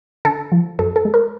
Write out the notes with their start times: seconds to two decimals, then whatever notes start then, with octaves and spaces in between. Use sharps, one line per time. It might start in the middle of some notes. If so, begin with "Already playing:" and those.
0.25 D3 A4
0.52 F3
0.79 F#2 A4
0.96 A4
1.05 G#3
1.14 A#4